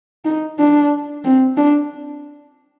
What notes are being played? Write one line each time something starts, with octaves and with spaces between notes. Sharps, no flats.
D#4
D4
C4
D4